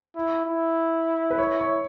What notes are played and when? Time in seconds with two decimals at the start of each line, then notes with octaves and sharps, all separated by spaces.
0.16 E4
0.46 E4
1.30 B4
1.38 C#5
1.59 C#5